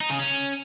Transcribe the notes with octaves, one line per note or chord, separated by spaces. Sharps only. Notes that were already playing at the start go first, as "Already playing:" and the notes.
D#4
C#3
C#4